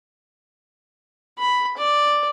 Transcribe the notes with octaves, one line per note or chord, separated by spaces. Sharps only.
B5
D5